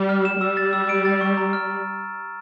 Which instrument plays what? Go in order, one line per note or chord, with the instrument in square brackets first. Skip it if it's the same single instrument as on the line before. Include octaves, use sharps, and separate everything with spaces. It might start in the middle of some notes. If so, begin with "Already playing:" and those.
Already playing: [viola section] G3
[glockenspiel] F6
E7
[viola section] G3 [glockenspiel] E6
[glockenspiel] A6
E6
D7
A6
C#6
A#5
F6